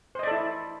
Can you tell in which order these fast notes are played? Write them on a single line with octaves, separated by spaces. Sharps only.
C5 D#5 D5 A4 E4